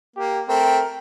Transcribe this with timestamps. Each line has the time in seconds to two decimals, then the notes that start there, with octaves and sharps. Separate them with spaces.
0.16 A#3 G4
0.49 A3 C4 A#4 G5